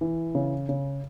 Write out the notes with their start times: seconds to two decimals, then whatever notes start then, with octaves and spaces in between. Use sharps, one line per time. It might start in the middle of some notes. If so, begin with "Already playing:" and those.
0.01 E3
0.35 C#3
0.69 C#3